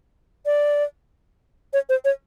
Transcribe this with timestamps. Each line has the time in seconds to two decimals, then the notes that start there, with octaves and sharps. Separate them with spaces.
0.46 D5
1.73 C#5
1.89 C5
2.05 C#5